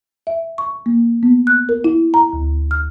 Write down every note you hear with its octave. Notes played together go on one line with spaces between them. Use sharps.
E5
C#6
A#3
B3
F#6
A#4
E4
A#5
D2
F6